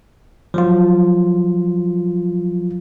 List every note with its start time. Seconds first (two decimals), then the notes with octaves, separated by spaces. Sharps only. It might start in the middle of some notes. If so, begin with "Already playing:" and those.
0.54 F3 F#3 F4